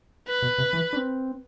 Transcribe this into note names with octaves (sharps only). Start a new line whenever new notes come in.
B4
B2
C3
E3
D4
C4